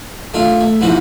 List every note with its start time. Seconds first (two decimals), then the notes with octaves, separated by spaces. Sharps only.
0.34 A3 D4 F4
0.61 A3
0.81 A#1 G#2 E3 F#4 C5